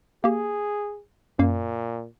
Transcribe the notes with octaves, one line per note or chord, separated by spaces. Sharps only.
A#3 G4 G#4
F#2 A#2 A#3 F5